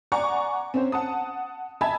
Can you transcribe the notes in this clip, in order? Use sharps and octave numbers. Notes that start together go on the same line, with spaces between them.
D5 F#5 G#5 A#5 C#6 D6
C4 C#4 C5
F#5 A5 D#6
D#5 E5 G#5 A5 B5 G#6